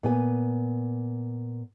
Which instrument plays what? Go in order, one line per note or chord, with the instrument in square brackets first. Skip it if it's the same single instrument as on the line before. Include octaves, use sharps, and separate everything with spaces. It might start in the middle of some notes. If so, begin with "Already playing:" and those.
[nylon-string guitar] A#2 B3 G#5